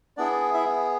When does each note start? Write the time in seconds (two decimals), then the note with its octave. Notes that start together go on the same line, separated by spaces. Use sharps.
0.17 B3 D4 E4 G#4 D5
0.54 E4 E5